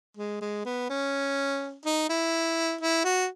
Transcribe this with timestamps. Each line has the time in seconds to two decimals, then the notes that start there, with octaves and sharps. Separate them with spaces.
0.17 G#3
0.41 G#3
0.65 B3
0.90 C#4
1.86 D#4
2.09 E4
2.81 E4
3.04 F#4